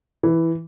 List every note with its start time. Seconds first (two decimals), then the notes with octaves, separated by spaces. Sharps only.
0.23 E3